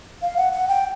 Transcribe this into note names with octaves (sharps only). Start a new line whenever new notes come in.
F5
F#5
F#5
G5